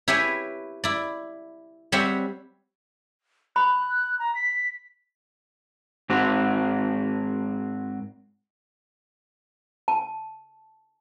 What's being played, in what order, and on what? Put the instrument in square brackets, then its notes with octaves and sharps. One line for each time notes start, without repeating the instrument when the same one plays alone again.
[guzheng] E4 G4 B4 C#5 E5 G#5
E4 D5
G3 C4 C#5 E5 F#5
[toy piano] B5 [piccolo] F#6
[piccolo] A#5
B6
[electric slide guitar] G#2 C4 F#4
[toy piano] A5